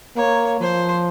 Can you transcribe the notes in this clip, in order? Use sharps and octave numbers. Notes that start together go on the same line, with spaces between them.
A#3 C#5
F3 C5